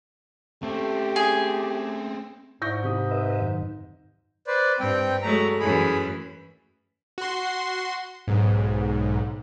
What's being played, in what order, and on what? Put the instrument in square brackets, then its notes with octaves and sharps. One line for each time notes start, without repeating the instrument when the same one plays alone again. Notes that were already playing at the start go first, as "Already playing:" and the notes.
[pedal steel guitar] A3 [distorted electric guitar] C4 C#4 [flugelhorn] G4
[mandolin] G#4
[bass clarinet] G#2 [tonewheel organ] E4 D5 [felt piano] C#6 G6 A#6
[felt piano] C3 D#6 [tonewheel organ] B5
[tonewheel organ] B4 D#5 E5
F#2 D#3
[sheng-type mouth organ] B4 C5 D5
[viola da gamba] G2 [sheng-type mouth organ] C4 G5
[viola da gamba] F#3 G#3 A3 [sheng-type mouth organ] A#5
[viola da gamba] F#2 E3 [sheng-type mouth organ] G#4 B5
[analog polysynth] F#4 C6
B1 G#2